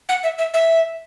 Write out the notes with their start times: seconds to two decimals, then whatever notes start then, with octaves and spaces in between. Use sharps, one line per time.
0.09 F#5
0.23 E5
0.38 E5
0.54 E5